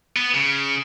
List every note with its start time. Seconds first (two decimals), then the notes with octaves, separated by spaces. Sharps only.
0.16 B3
0.34 C#3